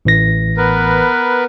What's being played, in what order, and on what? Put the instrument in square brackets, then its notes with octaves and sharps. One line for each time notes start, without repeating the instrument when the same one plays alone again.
[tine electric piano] A1 E3 A#6
[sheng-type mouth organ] B3 A#4 B4